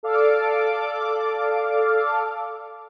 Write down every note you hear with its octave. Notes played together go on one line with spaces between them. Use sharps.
A4 D5 F5 D6